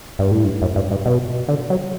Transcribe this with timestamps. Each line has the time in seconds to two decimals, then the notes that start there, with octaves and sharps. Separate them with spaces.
0.19 G2
0.31 A2
0.44 G2
0.62 F#2
0.76 G2
0.91 G2
1.06 B2
1.48 D3
1.70 F#3